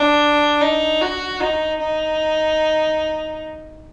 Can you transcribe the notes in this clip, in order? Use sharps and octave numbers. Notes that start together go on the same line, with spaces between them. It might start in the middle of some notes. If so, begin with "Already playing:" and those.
Already playing: D4
D#4
F#4
D#4
D#4